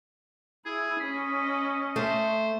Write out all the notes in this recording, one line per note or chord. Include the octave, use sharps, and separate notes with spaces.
E4 G#4
C#4 D#5 B5
A3 C5